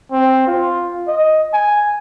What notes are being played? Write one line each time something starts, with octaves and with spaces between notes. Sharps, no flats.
C4
F4
D#5
G#5